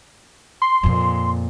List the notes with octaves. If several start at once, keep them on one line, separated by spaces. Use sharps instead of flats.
C6
F2 A#2